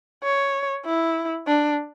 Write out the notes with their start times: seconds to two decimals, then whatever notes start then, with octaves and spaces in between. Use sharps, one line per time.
0.24 C#5
0.85 E4
1.47 D4